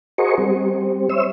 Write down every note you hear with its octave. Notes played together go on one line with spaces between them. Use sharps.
F#4 G#4 A#4 C5 D#5 C#6
G3 C4
C5 C#5 E5 E6